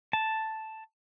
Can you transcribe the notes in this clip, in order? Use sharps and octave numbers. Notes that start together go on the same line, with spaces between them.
A5